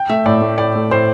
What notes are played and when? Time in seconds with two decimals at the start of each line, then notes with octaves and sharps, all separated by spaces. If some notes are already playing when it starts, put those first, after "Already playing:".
Already playing: G5
0.09 A3 E5
0.26 A2 D5
0.42 A3
0.58 A2 D5
0.75 A3
0.91 A2 C5